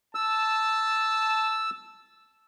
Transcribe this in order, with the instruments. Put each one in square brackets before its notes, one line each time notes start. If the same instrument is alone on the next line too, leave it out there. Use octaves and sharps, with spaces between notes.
[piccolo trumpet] A5 [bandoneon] E6